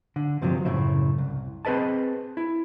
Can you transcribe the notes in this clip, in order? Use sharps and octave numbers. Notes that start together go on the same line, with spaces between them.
D3
G2 C3 F3 F#3
F#2 A2 C#3 E5
C2
C4 G#4 B4 D#5 A5
E4